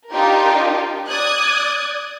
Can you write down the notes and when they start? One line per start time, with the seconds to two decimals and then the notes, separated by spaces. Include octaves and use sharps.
0.12 D4 D#4 F4 G4 A#4
1.07 D5 D#6 F#6 G#6